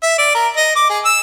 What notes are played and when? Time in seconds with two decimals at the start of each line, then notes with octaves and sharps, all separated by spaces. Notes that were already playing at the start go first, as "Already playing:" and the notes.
0.03 E5
0.18 D5
0.35 A#4
0.56 D#5
0.76 D6
0.89 G#4
1.05 E6